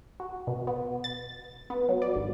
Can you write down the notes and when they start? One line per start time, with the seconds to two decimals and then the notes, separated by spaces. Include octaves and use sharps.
0.20 F#4
0.47 B2
0.67 B3
1.04 A6
1.70 B3
1.89 F#3
2.02 D5
2.15 G#1